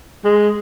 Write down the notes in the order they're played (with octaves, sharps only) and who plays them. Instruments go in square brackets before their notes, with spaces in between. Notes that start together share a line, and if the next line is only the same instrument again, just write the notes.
[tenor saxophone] G#3